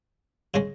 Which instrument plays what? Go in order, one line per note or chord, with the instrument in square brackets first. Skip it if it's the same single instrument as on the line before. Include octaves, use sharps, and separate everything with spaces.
[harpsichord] C#3 G#3 C#4